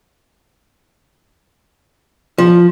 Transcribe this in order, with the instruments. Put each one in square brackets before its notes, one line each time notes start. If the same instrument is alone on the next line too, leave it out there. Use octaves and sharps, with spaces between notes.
[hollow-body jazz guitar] F3